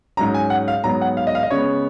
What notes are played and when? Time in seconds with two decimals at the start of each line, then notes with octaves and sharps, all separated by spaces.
0.17 G#2 F#3 C#4 A#5
0.34 G#5
0.50 F#5
0.68 F5
0.84 G#2 F#3 B3 A#5
1.01 F#5
1.17 F5
1.27 D#5
1.35 F5
1.43 D#5
1.51 C#3 G#3 B3 C#5